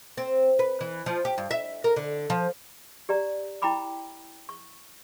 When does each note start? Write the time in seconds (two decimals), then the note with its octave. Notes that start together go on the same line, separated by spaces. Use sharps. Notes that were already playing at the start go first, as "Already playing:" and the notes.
0.17 C4
0.59 B4
0.81 E3
1.06 F3
1.25 G4
1.38 G2
1.51 E5
1.84 A#4
1.96 D3
2.30 F3
3.09 G4 D5 A#5
3.62 E4 G5 A#5 B5 D6
4.49 C#6